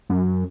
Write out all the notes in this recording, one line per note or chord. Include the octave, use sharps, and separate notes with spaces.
F#2